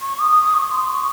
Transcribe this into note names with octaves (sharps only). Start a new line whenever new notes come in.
C#6
D#6
C#6
C6
C#6